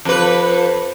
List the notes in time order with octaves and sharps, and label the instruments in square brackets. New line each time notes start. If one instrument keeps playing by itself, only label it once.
[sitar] F2 B4